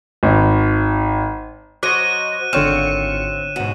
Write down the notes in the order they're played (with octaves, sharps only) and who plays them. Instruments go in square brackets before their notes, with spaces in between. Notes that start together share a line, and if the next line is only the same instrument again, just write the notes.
[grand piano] G#1
[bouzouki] F#3 C5 [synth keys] F#4 D#5 [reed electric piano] D6 [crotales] F#6 D#7
[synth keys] G#1 F4 C#7 [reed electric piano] D3 C#5 F6 [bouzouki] C4 [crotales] E7
[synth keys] G#2 B2 [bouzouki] F#4